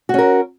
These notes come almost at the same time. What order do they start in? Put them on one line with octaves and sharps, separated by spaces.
F#4 C#4 A#4